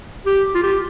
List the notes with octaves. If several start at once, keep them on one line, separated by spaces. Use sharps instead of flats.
G4
F4
G4